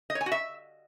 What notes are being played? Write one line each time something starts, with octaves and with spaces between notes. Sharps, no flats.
D#5
C#5
G#5
F#4
E5